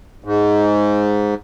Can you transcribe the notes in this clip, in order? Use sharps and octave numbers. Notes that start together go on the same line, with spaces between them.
G#2